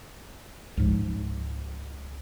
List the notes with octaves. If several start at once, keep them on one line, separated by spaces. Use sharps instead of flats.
C#2 G#2 F3